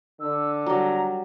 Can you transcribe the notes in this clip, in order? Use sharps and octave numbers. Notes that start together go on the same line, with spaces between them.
D3 E6
F#3 G3 A#5